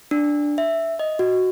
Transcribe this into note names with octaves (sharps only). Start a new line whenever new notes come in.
D4
E5
D#5
F#4